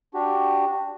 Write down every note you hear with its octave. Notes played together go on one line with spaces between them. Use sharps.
D4 F#4 G4